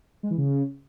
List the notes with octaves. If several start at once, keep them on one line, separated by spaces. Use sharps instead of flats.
G#3
E3
C#3